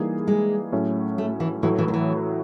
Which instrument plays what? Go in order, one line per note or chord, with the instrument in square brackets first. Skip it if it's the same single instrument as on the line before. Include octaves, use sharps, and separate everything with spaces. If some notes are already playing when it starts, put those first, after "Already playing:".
Already playing: [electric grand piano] E3 G3 A#3 D#4 G#4
[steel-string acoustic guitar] G#3
[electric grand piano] A2 F#3 A3 C#4
[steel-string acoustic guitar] A3
E3
[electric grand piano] A2 F#3 A3 [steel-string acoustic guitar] E3
[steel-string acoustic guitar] E3
D#3
E3